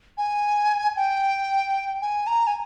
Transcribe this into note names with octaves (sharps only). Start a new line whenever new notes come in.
G#5
G5
G#5
A#5
G#5